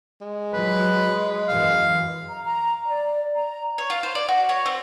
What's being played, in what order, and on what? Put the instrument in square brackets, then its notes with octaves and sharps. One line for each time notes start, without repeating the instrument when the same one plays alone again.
[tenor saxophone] G#3
[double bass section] F#3 [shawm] B4
[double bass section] F#2 E3 [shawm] F5
[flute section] A#5
A#5
D5
A#5
[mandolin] C#5
F4
C5
D5
F#4
C#5
C4